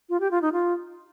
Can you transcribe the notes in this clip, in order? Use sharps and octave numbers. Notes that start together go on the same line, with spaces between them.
F4
G4
F4
D#4
F4